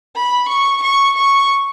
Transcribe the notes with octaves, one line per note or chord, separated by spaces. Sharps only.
B5
C#6
C#6
C#6